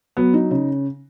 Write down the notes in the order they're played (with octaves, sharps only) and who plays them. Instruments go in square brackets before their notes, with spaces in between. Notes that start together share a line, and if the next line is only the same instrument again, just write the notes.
[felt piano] F#3 [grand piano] B3
[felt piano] D#4
C#3